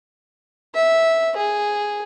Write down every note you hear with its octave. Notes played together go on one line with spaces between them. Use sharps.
E5
G#4